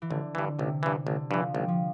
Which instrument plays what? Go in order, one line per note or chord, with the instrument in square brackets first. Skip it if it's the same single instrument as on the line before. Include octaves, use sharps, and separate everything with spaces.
[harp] E3
[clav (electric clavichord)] A1 [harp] D3
[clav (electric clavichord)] G2 E3
[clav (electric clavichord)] A1 [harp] C3
[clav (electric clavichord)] G2 E3
[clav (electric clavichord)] A1 [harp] D3
[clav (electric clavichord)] G2 E3 [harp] F3
[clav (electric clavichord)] A1 [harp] G3
[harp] F3